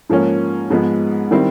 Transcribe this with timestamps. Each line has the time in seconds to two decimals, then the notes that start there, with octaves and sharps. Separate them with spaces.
0.09 G#2 F3 A#3 C#4
0.70 G#2 F3 G#3 B3
1.31 D#3 G3 C4 E4